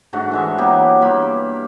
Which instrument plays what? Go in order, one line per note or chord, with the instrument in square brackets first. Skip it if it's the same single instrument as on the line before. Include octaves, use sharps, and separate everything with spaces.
[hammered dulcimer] G#2 D3 A3 F#4
E3 G#3 E5
F#3 A#3 B3 G4
G2 A#3 B5